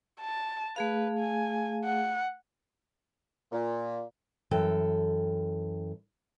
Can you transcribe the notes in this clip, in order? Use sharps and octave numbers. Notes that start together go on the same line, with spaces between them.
A5
A3 G#4 B4 F5
G#5
F#5
A#2
F#2 E3 A4 G5